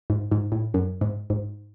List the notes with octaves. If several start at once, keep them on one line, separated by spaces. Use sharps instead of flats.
G#2
G#2
A2
F#2
G#2
G#2